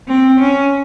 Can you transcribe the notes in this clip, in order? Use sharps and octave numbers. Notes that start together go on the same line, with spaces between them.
C4
C#4